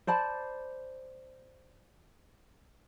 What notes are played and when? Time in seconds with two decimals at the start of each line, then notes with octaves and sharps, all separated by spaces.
0.07 C5 D5 A5 B5